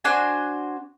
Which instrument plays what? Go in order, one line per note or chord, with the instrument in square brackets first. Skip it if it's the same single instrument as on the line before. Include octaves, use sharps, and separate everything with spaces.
[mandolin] D4 F#4 C5 G#5